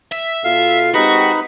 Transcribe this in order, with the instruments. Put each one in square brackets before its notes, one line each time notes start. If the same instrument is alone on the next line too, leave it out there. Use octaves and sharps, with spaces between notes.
[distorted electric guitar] E5
[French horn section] B2 F4 A4 [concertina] F5
[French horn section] G#3 C4 G4 [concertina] D#4 B4 [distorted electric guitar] F#4